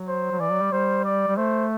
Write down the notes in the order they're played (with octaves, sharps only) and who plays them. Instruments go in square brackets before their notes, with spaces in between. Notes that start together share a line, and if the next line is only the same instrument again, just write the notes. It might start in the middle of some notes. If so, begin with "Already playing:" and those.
Already playing: [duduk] F#3
[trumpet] C5
[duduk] F#3
[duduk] E3 [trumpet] D5
[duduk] F#3
G3
[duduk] G3 [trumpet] C5
[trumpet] D5
[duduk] G3
[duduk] A3 [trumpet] C5